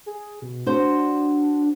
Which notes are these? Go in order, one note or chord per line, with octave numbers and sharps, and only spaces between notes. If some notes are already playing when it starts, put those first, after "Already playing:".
G#4
B2
D4 F#4 C5